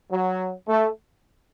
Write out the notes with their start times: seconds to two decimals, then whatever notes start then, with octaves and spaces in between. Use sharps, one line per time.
0.11 F#3
0.68 A3